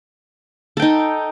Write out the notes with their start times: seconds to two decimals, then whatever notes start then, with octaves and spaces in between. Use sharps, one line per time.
0.77 A4
0.80 G5
0.82 D#4